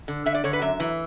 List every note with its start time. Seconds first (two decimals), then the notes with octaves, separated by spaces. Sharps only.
0.08 D3
0.26 D3 E5
0.35 D5
0.44 D3 C#5
0.53 B4
0.62 F#2 E5
0.80 E3